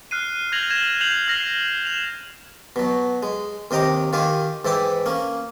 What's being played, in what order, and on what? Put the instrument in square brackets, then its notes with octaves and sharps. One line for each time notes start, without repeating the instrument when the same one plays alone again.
[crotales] F6 F#6 C7 D#7
F6 G6 G#6 A#6 F7 F#7
G#6 A#6 E7
G6 C7 F7 F#7
F6 A#6 C7
E7 F7
[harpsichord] B2 F#3
G#3
D#2 C3 D#5 G5 A#5 D6
D#3 F4 G4 G#5
G#2 E3 E4 G5 D6
A#3 C#4